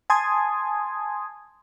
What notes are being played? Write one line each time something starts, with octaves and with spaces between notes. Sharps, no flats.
G#5 A5 C6 D#6 G#6